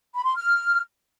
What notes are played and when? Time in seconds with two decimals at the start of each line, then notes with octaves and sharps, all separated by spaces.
0.14 B5
0.25 C6
0.37 F6